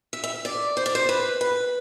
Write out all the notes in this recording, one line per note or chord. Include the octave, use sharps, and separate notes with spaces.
E5
E5
D5
C5
D5
C5
B4
B4